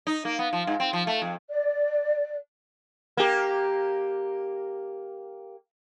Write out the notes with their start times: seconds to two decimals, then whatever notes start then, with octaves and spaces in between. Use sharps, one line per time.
0.07 D#4
0.25 A#3
0.39 B3
0.53 F3
0.67 G#2
0.80 C4
0.93 F3
1.07 A3
1.22 F2
1.50 D5
3.17 A#3 G4